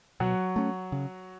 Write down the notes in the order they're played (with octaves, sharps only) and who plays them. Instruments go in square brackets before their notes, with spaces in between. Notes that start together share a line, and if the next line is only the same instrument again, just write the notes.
[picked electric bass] B2 [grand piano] F#3 F#4
[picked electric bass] A3 C#4
C#3